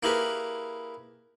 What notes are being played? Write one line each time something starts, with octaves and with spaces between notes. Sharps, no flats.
A#3 E4 G4 G#4 A#4 B4